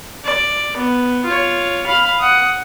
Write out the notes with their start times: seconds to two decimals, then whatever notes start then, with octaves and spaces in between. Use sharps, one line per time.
0.24 D5
0.76 B3
1.25 F4 C#5
1.87 F5 B5
2.19 F#5 D#6